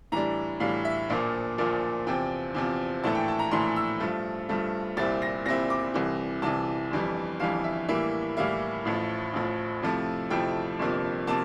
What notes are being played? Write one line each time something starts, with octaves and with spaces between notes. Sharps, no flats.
A2 E3 G3 D4 A#5
A2 E3 G3 D4 F5
E5
A#1 A#2 F3 A#3 F5
A#1 A#2 F3 A#3
E2 C3 F3 C4 G5
E2 C3 F3 C4
A#1 A2 E3 A3 A5
G5
A5
A#5
A#1 A2 E3 A3 C6
E6
G2 F3 A3
G2 F3 A3
C2 A#2 G3 C4 E4 A6
A#6
C2 A#2 G3 C4 E4 A#6
D6
C2 C3 E3
C2 C3 E3 A5
G1 F2 E3 G3
G1 F2 E3 G3 F5
E5
A2 E3 G3 A#3 E4 E5
A2 E3 G3 A#3 E4 F5
A1 A2 F3
A1 A2 F3
F2 C3 F3 A3 E4
F2 C3 F3 A3 E4 G5
G1 F2 C3 F3 A#3
C3 F3 A#3 A5